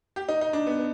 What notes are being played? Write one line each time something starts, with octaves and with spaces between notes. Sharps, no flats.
G4
D#4
D#4
D4
B3
B3